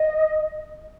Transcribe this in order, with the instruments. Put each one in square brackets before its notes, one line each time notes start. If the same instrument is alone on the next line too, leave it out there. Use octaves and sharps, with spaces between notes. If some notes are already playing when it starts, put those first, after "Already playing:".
Already playing: [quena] D#5